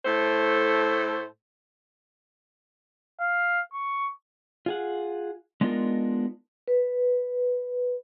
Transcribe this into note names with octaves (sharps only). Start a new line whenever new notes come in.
A2 A3 A4 C5
F5
C#6
F4 G#4 F#5
G#3 B3 D4 D#4 F4 A#4
B4